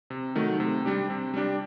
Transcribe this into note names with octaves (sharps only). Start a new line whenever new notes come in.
C3
D#3 F#3 A3
C3
G3 D4 G4
C3
G3 D4 G4